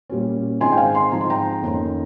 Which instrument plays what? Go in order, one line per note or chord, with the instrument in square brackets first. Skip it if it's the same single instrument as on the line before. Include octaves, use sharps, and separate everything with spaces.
[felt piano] A#2 G3 C#4
G#2 D#3 G#3 C4 D#4 G#5 C6
G5
F5 G#5
G#5 C6
G#2 F3 C4 A#5
C6
G5 A#5
F2 D#3 A#3 C#4